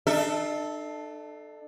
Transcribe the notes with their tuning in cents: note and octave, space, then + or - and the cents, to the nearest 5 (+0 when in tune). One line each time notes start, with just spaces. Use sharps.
D4 +45 A4 +0 E5 -15